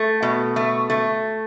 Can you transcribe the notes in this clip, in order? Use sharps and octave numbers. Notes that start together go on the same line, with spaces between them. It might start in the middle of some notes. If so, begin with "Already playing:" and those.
Already playing: A3
B2
A3
A3